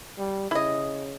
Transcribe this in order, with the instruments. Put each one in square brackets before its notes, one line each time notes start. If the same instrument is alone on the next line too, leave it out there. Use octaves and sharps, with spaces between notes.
[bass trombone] G3
[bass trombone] C#3 [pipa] E4 D#5